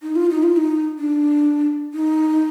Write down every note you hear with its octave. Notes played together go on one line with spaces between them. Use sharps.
D#4
F4
D#4
F4
D#4
D4
D#4